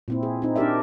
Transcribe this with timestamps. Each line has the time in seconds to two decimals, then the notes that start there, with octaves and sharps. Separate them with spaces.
0.08 A#2 C4 E4
0.23 G#4
0.42 C4 D#4
0.56 D4 D#4 G4 A#4 D5 E5